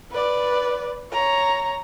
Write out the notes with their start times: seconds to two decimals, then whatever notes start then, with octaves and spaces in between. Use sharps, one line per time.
0.11 B4 D5
1.12 C#5 A#5